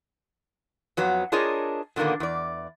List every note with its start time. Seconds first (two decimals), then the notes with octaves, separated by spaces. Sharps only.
0.97 F2 F#3 B3
1.32 D4 F4 G#4 A#4 C#5 D#5
1.96 A#2 D3 D#3 A#3 B3
2.20 E2 D5